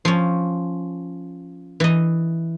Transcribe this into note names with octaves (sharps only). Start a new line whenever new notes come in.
F3 C#4
E3 D#5